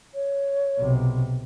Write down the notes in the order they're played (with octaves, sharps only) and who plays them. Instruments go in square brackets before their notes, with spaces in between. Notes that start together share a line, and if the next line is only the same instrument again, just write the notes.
[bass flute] C#5
[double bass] B1 C3